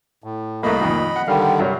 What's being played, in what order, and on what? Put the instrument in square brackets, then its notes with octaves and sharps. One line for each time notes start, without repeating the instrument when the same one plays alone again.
[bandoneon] A2
[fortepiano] C2 A3 A#3 [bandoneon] D#5 B5
[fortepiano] F2 A#2 D#3
F#5
[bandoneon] D3 D#3 G3 [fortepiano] F5
[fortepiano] G2 C3 F#3